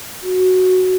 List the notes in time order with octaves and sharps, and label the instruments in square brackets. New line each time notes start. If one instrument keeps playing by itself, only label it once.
[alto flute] F#4